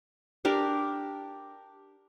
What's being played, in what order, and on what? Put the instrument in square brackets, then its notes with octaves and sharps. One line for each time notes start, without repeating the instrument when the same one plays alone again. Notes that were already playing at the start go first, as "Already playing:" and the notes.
[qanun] D4 G4 A#4